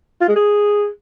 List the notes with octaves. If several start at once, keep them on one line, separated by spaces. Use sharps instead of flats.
F4
G#3
G#4